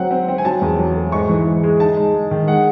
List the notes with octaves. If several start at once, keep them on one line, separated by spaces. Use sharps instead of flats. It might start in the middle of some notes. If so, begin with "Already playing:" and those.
Already playing: F#3 C4 F#5
C4
C4
G#5
F#3 A5
E2
F#3
A3
G#2 C#6
E3
G#2
G#3
D#4 A5
G#3
G#3
D#3
G#3 F#5